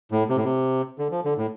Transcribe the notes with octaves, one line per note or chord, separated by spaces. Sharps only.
A2
C3
A2
C3
D3
F3
D3
A2